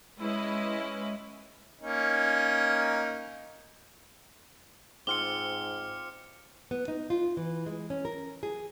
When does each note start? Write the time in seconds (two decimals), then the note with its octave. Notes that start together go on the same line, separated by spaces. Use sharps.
0.19 G#3 C#4 E4 B4 D#5
1.81 A#3 C#4 D#4
5.07 G#2 C4 F4 D6 F6 C#7 G7
6.71 B3
6.88 D#4
7.10 F4
7.37 E3
7.66 G#3
7.90 C#4
8.05 A#4
8.43 G#4